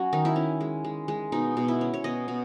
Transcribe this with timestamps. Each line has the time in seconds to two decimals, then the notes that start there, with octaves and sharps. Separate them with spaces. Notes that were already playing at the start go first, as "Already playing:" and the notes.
Already playing: F#3 C#4 F#4
0.13 D#3 D#4
0.25 E4
0.36 C#4
0.61 G#3
0.85 G#3
1.08 G#3
1.32 B2 D#4
1.57 B2
1.68 E4
1.81 C#4
1.94 C#5
2.04 B2 D#5
2.28 B2